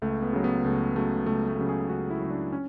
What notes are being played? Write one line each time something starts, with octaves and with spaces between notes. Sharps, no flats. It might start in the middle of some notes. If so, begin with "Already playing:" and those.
C#2 A3
B3
C#3 F#3
B3
C#2 A3
C#3 F#3 A3
C#2 A3
A3
C#3 F#3
G#4
C#2 F#4
E4
C#3 F#3
D4
C#4